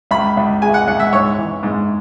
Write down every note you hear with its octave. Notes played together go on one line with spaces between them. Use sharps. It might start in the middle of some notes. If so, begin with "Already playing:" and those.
C#2 B5
C#2
G#3 G#5
F#5
C#2 F#5
E5
G#2 C#5
E3
G#2